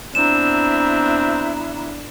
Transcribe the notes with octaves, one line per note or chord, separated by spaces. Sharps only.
B3 C4 D4 E4 A#5 E7